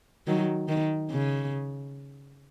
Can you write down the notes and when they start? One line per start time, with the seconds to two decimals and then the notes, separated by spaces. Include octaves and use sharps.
0.27 D#3 F#3
0.69 D#3
1.11 C#3